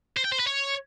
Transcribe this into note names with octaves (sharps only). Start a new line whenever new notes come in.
C5
G5
C5
B4
C#5